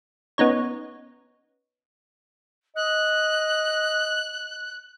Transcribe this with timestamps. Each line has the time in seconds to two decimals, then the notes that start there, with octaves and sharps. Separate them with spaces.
0.38 B3 C#4 D#4 C#5
2.76 D#5 F#6